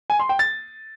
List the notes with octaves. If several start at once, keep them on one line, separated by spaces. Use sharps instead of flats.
G#5
C6
G5
A6